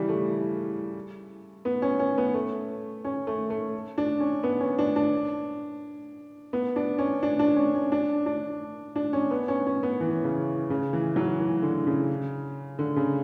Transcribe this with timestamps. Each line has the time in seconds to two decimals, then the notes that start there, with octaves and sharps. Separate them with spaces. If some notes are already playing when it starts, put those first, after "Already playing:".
Already playing: C#3 E3 G3
0.09 A3
1.65 B3
1.82 C#4
1.99 C#4
2.18 B3
2.34 A3
3.05 C#4
3.27 A3
3.50 A3
3.98 D4
4.20 C#4
4.43 B3
4.60 C#4
4.78 D4
4.96 D4
6.53 B3
6.76 D4
6.98 C#4
7.23 D4
7.39 D4
7.56 C#4
7.75 C#4
7.92 D4
8.26 D4
8.96 D4
9.13 C#4
9.31 B3
9.48 C#4
9.66 C#4
9.83 B3
10.00 E3
10.24 C#3
10.70 C#3
10.93 E3
11.16 F#3
11.40 E3
11.62 D3
11.87 C#3
12.79 D3
12.96 C#3